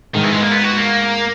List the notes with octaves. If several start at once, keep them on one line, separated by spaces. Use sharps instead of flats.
G#2 D#3
E3
G#3
A#3
B3
F#4
A#3